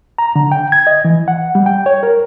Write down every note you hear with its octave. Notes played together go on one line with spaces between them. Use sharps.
A#5
D3
G5
G#6
D#5
E3
F#5
G3
G5
C#5
A#4